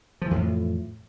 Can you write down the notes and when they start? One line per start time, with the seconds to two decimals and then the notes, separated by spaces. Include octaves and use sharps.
0.22 F3
0.26 E3
0.31 F2
0.36 A2